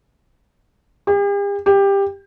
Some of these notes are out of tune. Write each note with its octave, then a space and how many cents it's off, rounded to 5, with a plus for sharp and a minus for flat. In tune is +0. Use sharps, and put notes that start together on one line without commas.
G4 +45
G4 +15